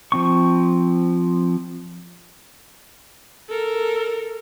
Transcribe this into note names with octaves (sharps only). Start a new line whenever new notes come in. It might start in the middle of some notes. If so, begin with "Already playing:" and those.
F3 C4 C#6
A4 A#4